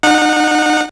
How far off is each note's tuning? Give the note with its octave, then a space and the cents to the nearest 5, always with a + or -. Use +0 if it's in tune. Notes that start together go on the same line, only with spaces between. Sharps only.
D#4 -35 F#5 -20